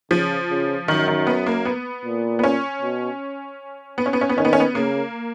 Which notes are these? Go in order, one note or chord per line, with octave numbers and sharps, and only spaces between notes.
C#3 F3
C#3
F#2 D#3
D#3
B3
A#3
B3
A#2
B3
C#4
B2
B3
C#4
B3
C#4
B3
D#3 C#4
B3
C#4
B3
C#3 A#3